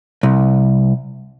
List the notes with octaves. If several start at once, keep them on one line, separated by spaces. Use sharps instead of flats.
C2